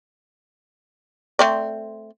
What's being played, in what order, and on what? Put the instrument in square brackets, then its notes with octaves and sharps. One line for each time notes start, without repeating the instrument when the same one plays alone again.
[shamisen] A3 C4 D5